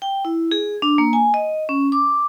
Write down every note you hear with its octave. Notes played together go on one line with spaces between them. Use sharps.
G5
E4
G#4
D4
A#3
G#5
D#5
C#4
D6